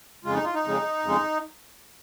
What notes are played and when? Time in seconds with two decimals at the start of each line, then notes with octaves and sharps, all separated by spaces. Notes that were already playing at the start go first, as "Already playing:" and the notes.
0.25 F2 C#3 G#3 F4
0.35 D#4
0.44 F4
0.54 D#4
0.64 F2 C#3 G#3
1.03 F2 C#3 G#3